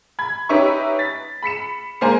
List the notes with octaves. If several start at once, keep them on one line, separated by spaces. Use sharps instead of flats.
B5 G#6
C#4 D#4 G4 B4 E5 C#6
A6 B6
B5 B6 C#7 E7
G#3 A#3 C5 G#5